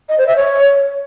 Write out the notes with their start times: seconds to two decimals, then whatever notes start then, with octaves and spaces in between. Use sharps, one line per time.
0.09 D#5
0.18 C5
0.27 E5
0.36 C#5